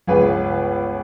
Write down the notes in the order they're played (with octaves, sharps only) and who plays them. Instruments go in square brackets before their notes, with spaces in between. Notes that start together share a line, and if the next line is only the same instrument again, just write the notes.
[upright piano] G1 C#2 G#4 B4